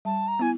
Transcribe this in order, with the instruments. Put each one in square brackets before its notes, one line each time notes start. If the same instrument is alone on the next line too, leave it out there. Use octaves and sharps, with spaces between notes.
[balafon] G3 [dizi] A5
[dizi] A#5
[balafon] B3 E4 [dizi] G#5